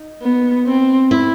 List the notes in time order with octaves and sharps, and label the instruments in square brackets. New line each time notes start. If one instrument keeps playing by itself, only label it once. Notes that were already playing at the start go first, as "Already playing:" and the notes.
Already playing: [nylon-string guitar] D#4
[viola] B3
C4
[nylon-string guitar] E4